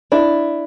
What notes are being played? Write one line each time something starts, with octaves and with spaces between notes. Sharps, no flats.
D4 E4